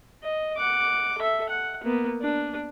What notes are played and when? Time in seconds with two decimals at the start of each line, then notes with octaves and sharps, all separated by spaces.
0.23 D#5
0.57 F#5 D6
1.18 A4 E5
1.49 F#5
1.84 A#3 B3
2.22 D4